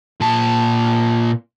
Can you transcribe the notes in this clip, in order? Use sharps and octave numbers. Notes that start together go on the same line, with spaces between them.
A#2 A5